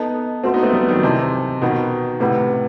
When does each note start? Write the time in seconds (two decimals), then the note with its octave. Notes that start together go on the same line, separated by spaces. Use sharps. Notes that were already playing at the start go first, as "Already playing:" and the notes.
Already playing: B3 D#4 A4 D#5 A5
0.44 A3 C4 F#4 B4 F#5 C6
0.54 B3 D#4
0.63 A3 C4
0.73 G3 B3
0.88 D#3 F#3
1.03 C3 E3 C5 D#5 A5 C6
1.61 B2 D#3 B4 F#5 B5
2.20 A2 C3 G4 B4 F#5 B5